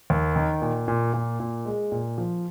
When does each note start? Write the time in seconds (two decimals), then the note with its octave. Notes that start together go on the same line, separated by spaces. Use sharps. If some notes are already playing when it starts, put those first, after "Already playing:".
0.10 D#2
0.36 D#3
0.62 A#2
0.88 A#2
1.13 A#2
1.40 A#2
1.65 G#3
1.92 A#2
2.18 F3